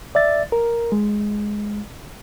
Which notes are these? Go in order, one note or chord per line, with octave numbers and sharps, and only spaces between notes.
D5 E5 A6
A#4
G#3